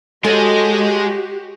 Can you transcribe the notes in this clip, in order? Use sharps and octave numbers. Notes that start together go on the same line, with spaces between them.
G#3 F#4 G4 A4 C#5 D#5 G#5